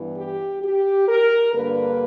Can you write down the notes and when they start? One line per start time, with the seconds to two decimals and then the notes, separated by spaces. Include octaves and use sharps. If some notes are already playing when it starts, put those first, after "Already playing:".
Already playing: G2 E3 B3
0.17 G4
0.63 G4
1.09 A#4
1.54 G2 D3 A#3 B4